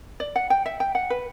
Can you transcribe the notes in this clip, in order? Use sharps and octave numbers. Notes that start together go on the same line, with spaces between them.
D5
F#5
G5
E5
G5
F#5
B4